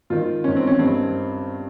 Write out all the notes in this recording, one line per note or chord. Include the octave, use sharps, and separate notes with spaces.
G#2 D#3 F4
G#2 D#3 C#4
C4
C#4
G2 D#3 C4